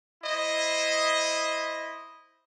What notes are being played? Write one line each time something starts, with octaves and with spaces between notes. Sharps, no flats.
E4 C5 D#5